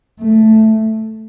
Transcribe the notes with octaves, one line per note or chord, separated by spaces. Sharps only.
A3